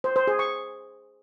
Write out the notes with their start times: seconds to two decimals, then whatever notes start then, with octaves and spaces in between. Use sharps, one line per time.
0.04 C5
0.16 C5
0.27 G#4
0.39 C#6